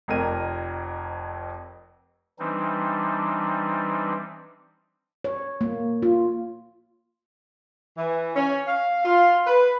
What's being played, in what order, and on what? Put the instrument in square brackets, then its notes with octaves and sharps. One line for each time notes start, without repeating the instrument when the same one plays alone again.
[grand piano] F1 F2 A#4 D#7
[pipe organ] E3 G3 C4 D4 D#4
[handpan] C#5
A#3
F4
[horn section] E3
C#4
F5
F4
B4